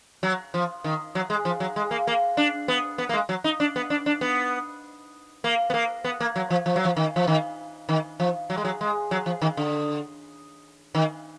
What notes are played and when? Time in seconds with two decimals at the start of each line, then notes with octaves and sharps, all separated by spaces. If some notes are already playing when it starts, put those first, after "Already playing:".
0.23 F#3
0.54 F3
0.84 D#3
1.15 F#3
1.30 G#3
1.45 F3
1.60 F#3
1.76 G#3
1.91 A#3
2.07 A#3
2.37 D4
2.68 B3
2.98 B3
3.09 A#3
3.13 G#3
3.29 F#3
3.44 D#4
3.60 D4
3.76 B3
3.90 D4
4.06 D4
4.21 B3
5.44 A#3
5.70 B3
5.74 A#3
6.04 B3
6.20 A#3
6.36 F#3
6.50 F3
6.66 F3
6.76 F#3
6.85 F3
6.96 D#3
7.16 F3
7.27 D#3
7.89 D#3
8.20 F3
8.50 F#3
8.57 G#3
8.65 F#3
8.81 G#3
9.11 F#3
9.26 F3
9.42 D#3
9.57 D3
10.95 D#3